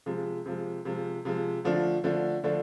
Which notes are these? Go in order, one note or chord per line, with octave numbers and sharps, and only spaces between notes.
C3 F3 G#3
C3 F3 G#3
C3 F3 G#3
C3 F3 G#3
D3 F3 A3 D4
D3 F3 A3 D4
D3 F3 A3 D4